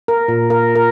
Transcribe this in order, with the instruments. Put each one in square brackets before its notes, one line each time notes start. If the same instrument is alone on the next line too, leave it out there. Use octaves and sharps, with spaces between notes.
[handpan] A#4
A#2
A#4
A#4